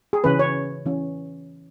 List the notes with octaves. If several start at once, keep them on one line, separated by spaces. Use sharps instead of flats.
G#4
C#3 E3 C#4 B4
C#5
E3 C#4